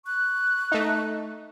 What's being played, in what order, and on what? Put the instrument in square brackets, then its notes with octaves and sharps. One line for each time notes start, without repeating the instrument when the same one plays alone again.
[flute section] C#6 F#6
[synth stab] A3 D#4